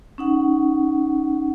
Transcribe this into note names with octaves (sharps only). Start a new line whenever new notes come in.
C#4 D#4 F#5